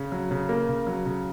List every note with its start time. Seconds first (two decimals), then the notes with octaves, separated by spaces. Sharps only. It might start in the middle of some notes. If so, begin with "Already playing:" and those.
Already playing: C#3
0.12 F#3
0.31 C#3
0.49 A#3
0.69 C#3
0.87 F#3
1.06 C#3